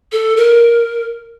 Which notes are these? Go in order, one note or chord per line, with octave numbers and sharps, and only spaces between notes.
A4
A#4